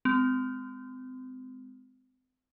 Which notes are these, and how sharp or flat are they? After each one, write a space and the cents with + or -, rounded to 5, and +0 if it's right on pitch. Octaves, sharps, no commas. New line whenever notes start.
G#3 +0 C4 -35